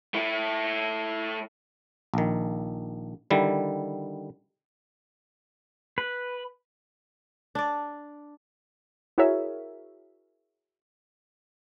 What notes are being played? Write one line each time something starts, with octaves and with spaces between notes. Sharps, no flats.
A3 E4
A#1 D#3
D3 D#3 G3 E4
B4
D4 D5
E4 F#4 G#4 A#4 C#5 E5